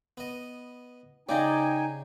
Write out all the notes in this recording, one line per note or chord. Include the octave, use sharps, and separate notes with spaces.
B3 D#5
C#3 D#4 G4 D5 D#5 G5 G#5